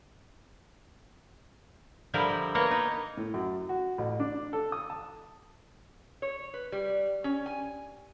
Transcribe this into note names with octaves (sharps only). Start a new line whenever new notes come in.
D3 F3 G3 E4 A#4
A#3 B3 A#4 C#5 D#5 F#5
D#4
A2
F#2
F#4
A1
D4
A4
D#6
A5
C#5
B4
G3
C#4
G#5